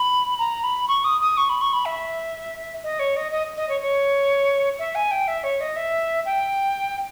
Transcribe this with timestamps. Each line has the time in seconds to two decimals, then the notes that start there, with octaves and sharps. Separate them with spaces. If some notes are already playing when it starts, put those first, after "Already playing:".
Already playing: B5
0.38 A#5
0.63 B5
0.88 C#6
1.04 D#6
1.20 D#6
1.37 C#6
1.49 B5
1.61 C#6
1.73 B5
1.85 E5
2.83 D#5
2.99 C#5
3.16 D#5
3.31 D#5
3.57 D#5
3.69 C#5
3.80 C#5
4.78 E5
4.95 G#5
5.11 G5
5.27 E5
5.43 C#5
5.60 D#5
5.76 E5
6.25 G5